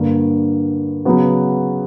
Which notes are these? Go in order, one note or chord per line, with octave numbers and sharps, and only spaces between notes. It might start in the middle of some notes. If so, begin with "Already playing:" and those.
Already playing: G2 D3 A#3
C#3 F#3 B3 F#4